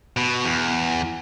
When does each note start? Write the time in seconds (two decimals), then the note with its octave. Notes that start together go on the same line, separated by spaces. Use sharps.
0.17 B2
0.45 E2